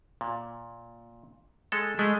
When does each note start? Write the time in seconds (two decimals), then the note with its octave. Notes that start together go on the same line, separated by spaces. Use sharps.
0.21 A#2
1.72 G#3 A4
1.99 G#3 A3